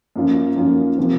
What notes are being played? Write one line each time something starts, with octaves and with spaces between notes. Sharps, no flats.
F#2 F3 A#3 F4
F#2 F3 A#3 F4
C3 F3 C4